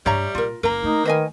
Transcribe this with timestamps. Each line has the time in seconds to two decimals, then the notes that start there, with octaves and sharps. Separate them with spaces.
0.06 G2 G3 D4 C#5 E5 A#5
0.35 A#2 F4 A#4
0.63 F#1 A#3 A#4 A#5
0.83 A3 D#4
1.05 D#3 B4 D#5 G#5